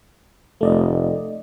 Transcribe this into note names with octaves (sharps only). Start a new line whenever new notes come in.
F1 A3 D5 D#5